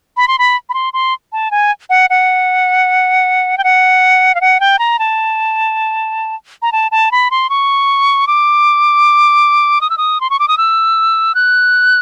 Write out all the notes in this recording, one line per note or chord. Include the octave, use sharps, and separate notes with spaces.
B5
C6
B5
B5
C6
C6
A5
G#5
F#5
F#5
G5
F#5
F5
F#5
G5
A#5
A5
A#5
A5
A5
B5
C6
C#6
D6
D#6
E6
D#6
C6
C#6
D6
D#6
E6
F#6